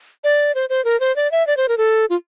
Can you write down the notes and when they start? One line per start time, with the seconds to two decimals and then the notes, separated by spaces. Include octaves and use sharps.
0.24 D5
0.55 C5
0.70 C5
0.85 A#4
1.00 C5
1.16 D5
1.32 E5
1.47 D5
1.57 C5
1.69 A#4
1.78 A4
2.10 F4